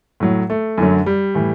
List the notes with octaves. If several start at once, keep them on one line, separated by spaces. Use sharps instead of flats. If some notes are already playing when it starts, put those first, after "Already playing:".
A2 F#3
A3
F#2 D3 F#3
G3
A2 E3